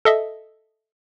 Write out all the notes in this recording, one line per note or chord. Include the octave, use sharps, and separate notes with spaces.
A4 D#5 E5